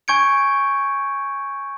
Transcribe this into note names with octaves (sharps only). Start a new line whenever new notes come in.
G#5 C#6 G6 G#6 C#7 D7